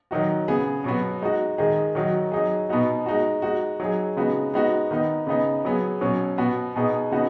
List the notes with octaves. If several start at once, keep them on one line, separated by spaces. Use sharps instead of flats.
D#3 F#3 D#4 F#4
C#3 B3 G#4
B2 F#3 B3 F#4
G#3 D#4 F#4
D#3 G#3 D#4 G#4
D#3 F#3 D#4 F#4
F#3 D#4 G#4
B2 B3 D#4 F#4
G#3 D#4 F#4
G#3 D#4 F#4
F#3 D#4 G#4
C#3 G#3 B3 D#4 F#4
G#3 B3 D#4 F#4
D#3 B3 D#4
C#3 B3 D#4
F#3 B3 G#4
B2 F#3 C#4
B2 B3 F#4
B2 B3 D#4 G#4
C#3 B3 D#4 F#4